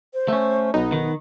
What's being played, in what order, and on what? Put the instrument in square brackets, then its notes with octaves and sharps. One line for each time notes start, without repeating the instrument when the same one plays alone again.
[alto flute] C5
[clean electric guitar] A3 C#4
[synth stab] B1 D#4 [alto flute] B3
[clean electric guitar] D#3